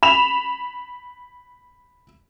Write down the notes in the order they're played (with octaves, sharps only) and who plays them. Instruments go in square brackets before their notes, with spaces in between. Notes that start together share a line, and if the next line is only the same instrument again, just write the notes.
[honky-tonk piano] B5 E7 F7